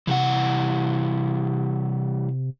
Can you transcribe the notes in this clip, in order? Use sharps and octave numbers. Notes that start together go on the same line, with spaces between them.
C3 E3 G3 F#5